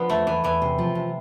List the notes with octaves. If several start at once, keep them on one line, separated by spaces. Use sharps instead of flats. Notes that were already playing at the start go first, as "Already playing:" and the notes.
Already playing: F3 B3 D4
E2 A3
E2 E3
E2 E3
C3
F3
C3